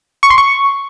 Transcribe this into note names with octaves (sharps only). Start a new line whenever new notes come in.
C#6
C6
C#6